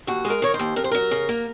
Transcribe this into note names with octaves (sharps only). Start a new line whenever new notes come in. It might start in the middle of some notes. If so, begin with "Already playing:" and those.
D#2 F#4
G#3
A#4
D#3 C#5
C5
D#2
F2 A#4
C5
F#3 A#4
C#3
A#3